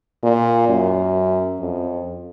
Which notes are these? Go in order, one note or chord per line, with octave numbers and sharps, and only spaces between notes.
A#2
F#2
F2